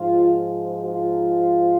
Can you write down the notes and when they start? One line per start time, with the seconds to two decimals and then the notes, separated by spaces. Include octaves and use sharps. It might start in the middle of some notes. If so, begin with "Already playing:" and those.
Already playing: G#2 F3 F4
0.84 F4